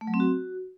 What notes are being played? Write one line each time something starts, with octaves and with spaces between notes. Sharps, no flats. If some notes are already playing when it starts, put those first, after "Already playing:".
A3
F#3
C4
F#4